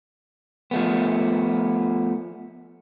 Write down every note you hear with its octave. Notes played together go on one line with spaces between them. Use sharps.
F3 A3 B3